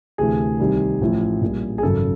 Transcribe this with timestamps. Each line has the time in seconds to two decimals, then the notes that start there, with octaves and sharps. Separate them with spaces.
0.18 D2 C3 E3 A3 G#4
0.60 C2 C3 D#3 G3
1.01 A1 A2 F3
1.42 A#1 A#2 G3
1.78 G#4
1.83 G#1 F#2 C#3 A4